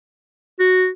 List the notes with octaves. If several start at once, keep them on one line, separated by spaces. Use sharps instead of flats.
F#4